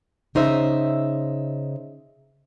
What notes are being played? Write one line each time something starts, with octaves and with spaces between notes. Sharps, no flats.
C#3 D#4 C5 E5